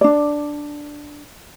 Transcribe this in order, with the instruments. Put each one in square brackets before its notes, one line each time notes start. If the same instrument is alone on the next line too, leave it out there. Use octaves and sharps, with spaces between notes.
[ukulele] D4 D5